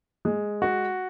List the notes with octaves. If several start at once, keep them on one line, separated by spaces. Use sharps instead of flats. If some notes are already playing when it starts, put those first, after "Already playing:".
G#3
F#4